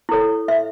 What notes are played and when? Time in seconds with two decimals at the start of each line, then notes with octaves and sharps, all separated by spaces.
0.09 E4 A4 C#5
0.48 E5